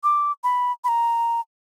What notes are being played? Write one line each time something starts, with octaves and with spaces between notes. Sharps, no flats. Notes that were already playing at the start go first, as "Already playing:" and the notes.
D6
B5
B5
A#5